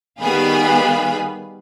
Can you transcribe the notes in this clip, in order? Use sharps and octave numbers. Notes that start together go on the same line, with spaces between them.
D#3 G3 B3 G#4 F5 B5